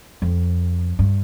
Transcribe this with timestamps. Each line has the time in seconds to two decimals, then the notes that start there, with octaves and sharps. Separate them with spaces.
0.22 F2
0.99 G2